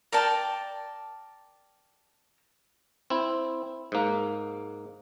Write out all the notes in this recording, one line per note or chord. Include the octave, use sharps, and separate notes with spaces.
A#4 D5 G5 A5
C4 E4
G#2 A#3